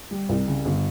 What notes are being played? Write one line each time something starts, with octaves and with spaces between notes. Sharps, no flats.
G3
C2
C#3
G1